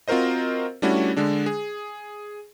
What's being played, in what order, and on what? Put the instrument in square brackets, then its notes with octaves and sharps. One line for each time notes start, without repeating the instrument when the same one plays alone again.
[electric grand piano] C4 F4 F#4 A#4 C5 D#5
G3 A3 C#4 D4 E4 F#4
D3 G#3 D4
G#4